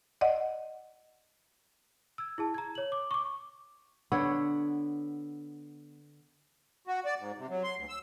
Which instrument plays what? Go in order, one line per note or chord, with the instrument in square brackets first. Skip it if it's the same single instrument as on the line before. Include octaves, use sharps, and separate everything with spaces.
[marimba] D5 D#5 F#5
[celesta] E6 G#6
E4 G#4 A5
A#5 G#6
C#5 F#7
D6
C#6 D6
[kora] D3 B3 C#5
[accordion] F#4
D5
G#2
C3
F#3
C6
D2
E6